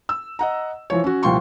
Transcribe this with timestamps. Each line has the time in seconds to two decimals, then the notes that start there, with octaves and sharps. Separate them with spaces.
0.09 E6
0.39 D#5 F#5 A#5
0.90 E3 F3 C#5
1.04 C#4 F#4
1.23 C2 A#2 F3 G5 C6 C#6